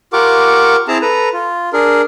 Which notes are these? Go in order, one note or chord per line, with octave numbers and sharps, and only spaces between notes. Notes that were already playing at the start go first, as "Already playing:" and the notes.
F4 G4 A#4 F#5 C#6 D6
C4 E4 G#4 A5 A#5
A4 B4 A#5
F4
D4 G#4 A#4